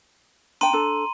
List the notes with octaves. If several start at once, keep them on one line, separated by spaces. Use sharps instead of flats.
D4 G5 A#5 C6 D#7
D4 A4